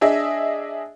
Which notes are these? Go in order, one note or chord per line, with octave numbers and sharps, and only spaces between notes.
D4 G#4 D#5 E5